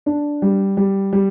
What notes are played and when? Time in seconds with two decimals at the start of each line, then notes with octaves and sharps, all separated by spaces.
0.06 D4
0.42 G3
0.77 G3
1.13 G3